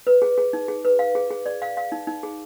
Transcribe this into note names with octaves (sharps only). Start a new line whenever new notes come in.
B4
G#4
G#4
D#4
G#4
B4
F5
G#4
G#4
D5
F5
F5
D#4
D#4
G#4